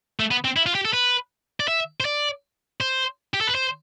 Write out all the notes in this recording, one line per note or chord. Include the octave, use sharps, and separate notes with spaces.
A3
B3
C4
E4
F4
G4
A4
B4
D5
E5
C5
D5
C5
G4
A4
B4
C5